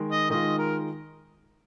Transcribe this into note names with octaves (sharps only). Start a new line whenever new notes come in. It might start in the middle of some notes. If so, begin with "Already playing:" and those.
Already playing: D#3 G#3 D#4 A#4
D#5
D#3 G#3 F4 D#5
A#4